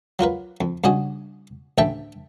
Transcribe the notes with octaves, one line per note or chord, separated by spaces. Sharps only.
F#3 F4 A#4 B4
F2
G2 C#3 F#4 D#5 G#5
A1 D2 A4 E5 G5 A5